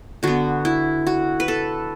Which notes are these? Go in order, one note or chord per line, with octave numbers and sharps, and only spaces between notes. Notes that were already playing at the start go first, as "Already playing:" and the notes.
D3 B3 F#4
E4
F#4
B4
A4